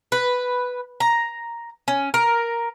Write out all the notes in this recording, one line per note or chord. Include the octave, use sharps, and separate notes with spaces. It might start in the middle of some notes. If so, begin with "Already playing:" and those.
B4
A#5
C#4
A#4